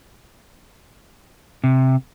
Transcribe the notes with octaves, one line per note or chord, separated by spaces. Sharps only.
C3